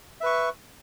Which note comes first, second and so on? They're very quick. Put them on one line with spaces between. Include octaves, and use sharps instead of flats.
E5 B4 C#6